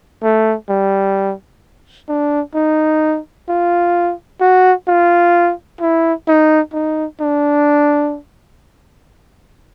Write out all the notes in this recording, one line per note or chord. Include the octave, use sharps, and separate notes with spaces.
A3
G3
D4
D#4
F4
F#4
F4
E4
D#4
D#4
D4